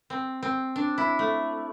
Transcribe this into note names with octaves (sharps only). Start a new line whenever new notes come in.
C4
C4
D4
E4
A3